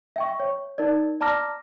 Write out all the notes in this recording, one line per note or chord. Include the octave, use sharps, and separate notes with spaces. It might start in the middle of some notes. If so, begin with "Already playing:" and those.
E5 G5 C#6
C#5
D#4 A#4 D5
D5 A5 A#5 D6 F6 A#6